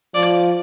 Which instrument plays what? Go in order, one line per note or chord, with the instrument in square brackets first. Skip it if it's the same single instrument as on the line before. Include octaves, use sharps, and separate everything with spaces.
[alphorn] F3 [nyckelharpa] D5